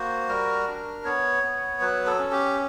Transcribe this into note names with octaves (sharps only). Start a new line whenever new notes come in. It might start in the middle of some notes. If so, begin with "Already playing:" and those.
Already playing: A#3 F#4 C5
G3 A#4
D4
B3 C#5
B3
F#3 B4
A4
C#4
G4